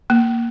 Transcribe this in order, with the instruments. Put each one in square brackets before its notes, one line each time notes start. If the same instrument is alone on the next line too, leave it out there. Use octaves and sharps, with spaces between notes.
[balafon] A#3